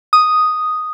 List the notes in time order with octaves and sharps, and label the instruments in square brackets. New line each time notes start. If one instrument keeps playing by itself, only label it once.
[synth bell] D#6